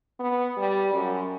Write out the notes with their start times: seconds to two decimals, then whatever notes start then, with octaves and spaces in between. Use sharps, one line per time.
0.20 B3
0.57 G3
0.93 F#2